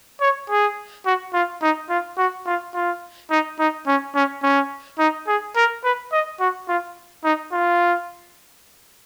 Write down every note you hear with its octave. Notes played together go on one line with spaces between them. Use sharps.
C#5
G#4
F#4
F4
D#4
F4
F#4
F4
F4
D#4
D#4
C#4
C#4
C#4
D#4
G#4
A#4
B4
D#5
F#4
F4
D#4
F4